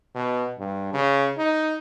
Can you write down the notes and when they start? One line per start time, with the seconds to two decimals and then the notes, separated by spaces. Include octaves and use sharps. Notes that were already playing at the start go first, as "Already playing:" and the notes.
0.15 B2
0.58 G2
0.93 C#3
1.38 D#4